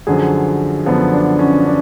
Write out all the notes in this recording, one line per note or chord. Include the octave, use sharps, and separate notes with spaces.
F#2 D3 F3 G#4
F#2 D3 F3 B3
D4
C#4
D4